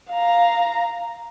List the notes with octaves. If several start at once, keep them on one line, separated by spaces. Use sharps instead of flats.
F5 A#5